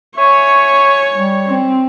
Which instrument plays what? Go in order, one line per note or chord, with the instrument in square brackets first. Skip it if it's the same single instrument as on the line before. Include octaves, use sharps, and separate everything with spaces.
[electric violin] C#5 [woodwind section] E5 G#5 C#6
[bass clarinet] G3
[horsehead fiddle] C4